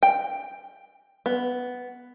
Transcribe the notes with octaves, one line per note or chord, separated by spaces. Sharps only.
G5
B3